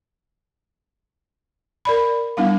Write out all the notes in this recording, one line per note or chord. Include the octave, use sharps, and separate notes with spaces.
A#4 D5 B5
G3 B3 D4 E4 F5